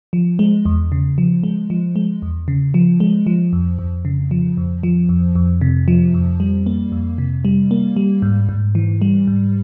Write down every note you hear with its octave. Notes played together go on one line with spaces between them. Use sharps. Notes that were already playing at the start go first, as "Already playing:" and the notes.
F3
G#3
E2
C#3
F3
G#3
F3
G#3
E2
C#3
F3
G#3
F3
F2
F2
C#3
F3
F2
F3
F2
F2
C3
F3
F2
G3
A#3
F2
C3
G3
A#3
G3
G#2
G#2
E3
G3
G#2